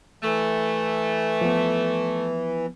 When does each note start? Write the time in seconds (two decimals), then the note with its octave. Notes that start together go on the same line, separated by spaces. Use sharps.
0.23 E3 A3
1.41 F3 B3